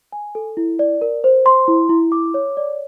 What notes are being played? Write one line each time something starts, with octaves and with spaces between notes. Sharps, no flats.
G#5
A4
E4
D5
A#4
C5
C6
E4
E4
D6
C#5
D5